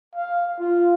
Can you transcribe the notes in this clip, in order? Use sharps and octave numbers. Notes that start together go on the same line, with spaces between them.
F5
F4